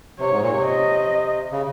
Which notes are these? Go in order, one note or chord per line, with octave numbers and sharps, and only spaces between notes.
C3 C#5
G#2
A#2
C3
D#5
C#3